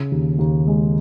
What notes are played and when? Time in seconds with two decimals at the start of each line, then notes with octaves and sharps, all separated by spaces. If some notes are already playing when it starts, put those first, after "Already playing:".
Already playing: C#3
0.12 D#2
0.39 D#2
0.67 G#3